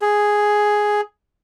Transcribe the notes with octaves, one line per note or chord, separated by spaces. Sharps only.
G#4